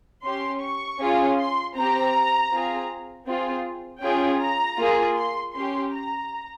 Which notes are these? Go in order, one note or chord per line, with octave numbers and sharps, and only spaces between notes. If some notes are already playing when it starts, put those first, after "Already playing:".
C#4 G4 C6
C#6
C#4 F4 G#4
C6
C4 G4 A#5
C4 F4 G#4
C4 F4 G#4
C#4 F4 G#4 G5
A#5
A#3 F4 G#4
C6
C#4 G4 C6
A#5